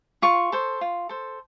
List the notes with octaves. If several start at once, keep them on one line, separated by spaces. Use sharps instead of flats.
F4 C#6
A4 C5
F4
A4 C5